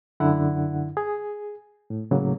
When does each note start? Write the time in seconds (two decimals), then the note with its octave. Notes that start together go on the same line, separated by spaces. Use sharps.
0.20 F#2 D3 E4 F#5
0.97 G#4
1.90 A2
2.11 A2 C#3 F#3 A#3